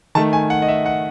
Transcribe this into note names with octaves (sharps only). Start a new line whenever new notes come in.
D#3 A3 A5
G#5
F#5
D#5
E5
F#5